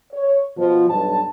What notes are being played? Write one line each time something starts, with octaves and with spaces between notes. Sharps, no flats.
C#5
B2 F3
B1 G2 A5